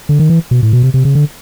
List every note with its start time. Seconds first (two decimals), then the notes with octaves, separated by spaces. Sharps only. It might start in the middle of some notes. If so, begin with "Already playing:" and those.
0.09 D3
0.19 D#3
0.30 E3
0.51 B2
0.63 A2
0.73 B2
0.83 C3
0.94 C3
1.05 C#3
1.15 D3